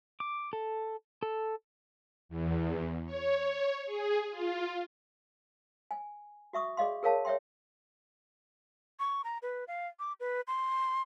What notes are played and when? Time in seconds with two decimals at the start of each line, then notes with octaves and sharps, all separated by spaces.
0.20 D6
0.53 A4
1.23 A4
2.29 E2
3.06 C#5
3.35 C#5
3.86 G#4
4.31 F4
5.91 G#5
6.53 F#4 E5 C#6 D#6
6.77 G#4 D5 D#5 F5 C6
7.03 G#4 A#4 C#5 F5 A5
7.25 C#5 D5 E5 G5 C6
8.99 C#6
9.24 A#5
9.42 B4
9.68 F5
9.99 D6
10.20 B4
10.47 C6